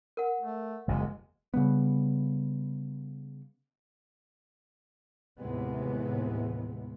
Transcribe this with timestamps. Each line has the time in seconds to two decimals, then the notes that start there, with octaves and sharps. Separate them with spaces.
0.17 A#4 F#5
0.41 A3
0.88 F#1 E2 C3 G#3
1.54 C#3 G3 B3
5.40 D#2 A2 C3 E3 G#3 B3